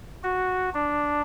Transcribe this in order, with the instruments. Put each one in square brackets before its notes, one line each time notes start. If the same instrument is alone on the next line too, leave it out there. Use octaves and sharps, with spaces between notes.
[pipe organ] F#4
D4